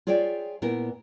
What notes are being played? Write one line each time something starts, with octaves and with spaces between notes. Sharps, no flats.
F4 G#4 C#5 D5 E5 G5
A#2 B3 E4 A#4